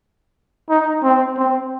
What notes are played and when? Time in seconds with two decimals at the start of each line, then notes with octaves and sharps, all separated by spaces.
0.69 D#4
1.03 C4
1.37 C4